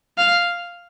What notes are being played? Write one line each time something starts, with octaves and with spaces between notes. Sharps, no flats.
F5